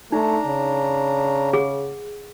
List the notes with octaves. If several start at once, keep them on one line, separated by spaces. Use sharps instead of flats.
A3 D4 D#4 A#5
C#3
G#4 F#5